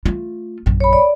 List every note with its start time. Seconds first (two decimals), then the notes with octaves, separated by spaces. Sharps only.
0.06 A3 F4
0.66 A#1 F#2
0.80 C#5 B5
0.93 D5